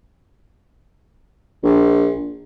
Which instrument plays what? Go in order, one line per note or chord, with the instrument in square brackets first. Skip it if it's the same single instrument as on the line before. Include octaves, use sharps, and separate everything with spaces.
[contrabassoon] A#1